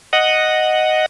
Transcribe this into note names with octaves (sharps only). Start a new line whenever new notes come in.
D#5 F#5